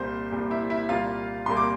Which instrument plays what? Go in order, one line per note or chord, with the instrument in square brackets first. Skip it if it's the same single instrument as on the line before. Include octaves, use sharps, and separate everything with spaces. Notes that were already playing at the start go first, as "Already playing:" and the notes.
Already playing: [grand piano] C2 A#2 G3 C5 C6
C2 A#2 G3
E4 E5
E4 E5
C2 A#2 G3 A#3 F4 F5
C2 A#2 G3 A#3 C6
D6